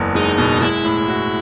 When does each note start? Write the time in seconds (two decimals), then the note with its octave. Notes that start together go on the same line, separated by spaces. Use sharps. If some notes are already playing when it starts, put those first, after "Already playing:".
Already playing: F#1 E2
0.15 G#3 D#4
0.38 B2
0.62 G#3 E4
0.85 A2
1.08 F#4